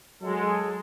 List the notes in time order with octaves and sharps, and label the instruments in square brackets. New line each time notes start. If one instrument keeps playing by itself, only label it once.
[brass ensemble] F#3 G#3 A4